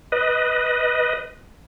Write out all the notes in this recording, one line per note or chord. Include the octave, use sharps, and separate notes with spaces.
B4 D#5